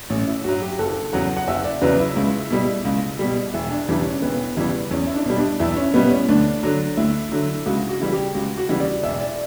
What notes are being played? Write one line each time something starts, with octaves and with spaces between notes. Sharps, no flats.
A1 C#4
E4
G2 F#3 F#4
G4
F#1 A4
E2 C#3 F#3 F#5
F#5
F#1 E5
D5
E2 C#3 F#3 B4
E4
C#2
B2 G3
C#2
B2 G3
E1 E4
D4
E2 C#3 E3 G3 D4
C#4
E1 B3
E2 C#3 E3 G3
E2 C#4
E4
D4
B2 G3
D4
E2 E4
C#4
B2 G3 B3
C#4
D2 D4
D3 F#3
D2 E4
D3 F#3
C#2 F#4
F#4
C#3 E3 G3
G4
C#2 F#4
F#4
C#3 E3 G3
D5
E1 E5
D5